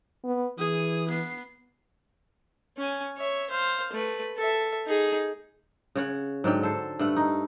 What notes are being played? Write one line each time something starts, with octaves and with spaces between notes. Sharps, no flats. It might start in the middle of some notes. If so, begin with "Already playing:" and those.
B3
E3 G#4 D#6
B3 C7
C#4 G#5
C#5 E5
C5 F5
A3 B4
A4 E5
D#4 G#4
C#3 C#5 F#5
G#2 D3 F#3 G5
A4 C5
G2 A3 F#5
D#4